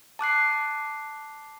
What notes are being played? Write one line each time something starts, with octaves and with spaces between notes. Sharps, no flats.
A5 D6 F#6 C7